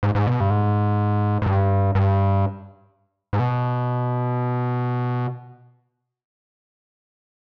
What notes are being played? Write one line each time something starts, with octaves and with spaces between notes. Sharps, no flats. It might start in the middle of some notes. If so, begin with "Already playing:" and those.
G#2
G#2
B2
G2
G#2
G#2
G2
G2
G#2
B2